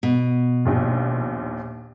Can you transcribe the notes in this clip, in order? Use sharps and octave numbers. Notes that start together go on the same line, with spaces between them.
B2
A#1 D#2 A#2